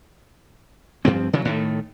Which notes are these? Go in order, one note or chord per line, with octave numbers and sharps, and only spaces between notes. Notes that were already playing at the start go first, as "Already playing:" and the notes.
G2 F3 C4
C#3 E3 F#3
A2 D#3 A3